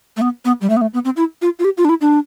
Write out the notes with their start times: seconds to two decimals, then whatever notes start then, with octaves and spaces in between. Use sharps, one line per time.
0.17 A3
0.21 B3
0.45 B3
0.61 G3
0.70 A3
0.77 B3
0.81 A3
0.94 B3
1.05 C4
1.17 E4
1.42 F4
1.59 F4
1.65 G4
1.78 F4
1.85 D4
1.89 E4
2.01 D4